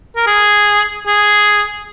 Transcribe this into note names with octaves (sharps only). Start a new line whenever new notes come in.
A#4
G#4
G#4